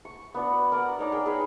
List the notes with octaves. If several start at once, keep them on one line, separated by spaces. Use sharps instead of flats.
C#6
B3 D4 F#4
A#4 D5 F#5
D4 D#4 A#4 C#5
G#4 A#4 G5
G#4 B4 C#5 D#5